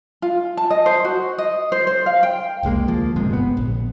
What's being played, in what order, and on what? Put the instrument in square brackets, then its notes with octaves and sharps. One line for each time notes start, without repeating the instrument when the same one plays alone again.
[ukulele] F4
A5
D#5
C5
F#4
D#5
C5
C5
F5
G5
[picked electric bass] F1 C2 G#3 A#3
D2 F3 A#3
D#1 G#2 C3 G#3
G1 B3
A#1